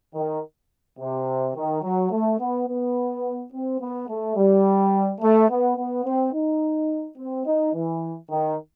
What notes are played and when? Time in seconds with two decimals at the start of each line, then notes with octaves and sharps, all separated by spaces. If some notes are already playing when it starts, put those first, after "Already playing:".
0.15 D#3
0.99 C3
1.55 D#3
1.83 F#3
2.11 A3
2.39 B3
2.68 B3
3.52 C4
3.80 B3
4.08 A3
4.36 G3
5.20 A3
5.49 B3
5.77 B3
6.05 C4
6.33 D#4
7.17 C4
7.46 D#4
7.74 E3
8.30 D#3